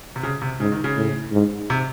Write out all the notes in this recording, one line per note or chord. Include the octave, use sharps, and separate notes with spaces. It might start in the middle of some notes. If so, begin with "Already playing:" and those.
C3
C#3
C3
G#2 C#3
D#3
C#3
A2
G#2
C3